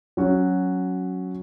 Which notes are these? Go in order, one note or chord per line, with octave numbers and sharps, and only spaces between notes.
F#3 C#4 F#4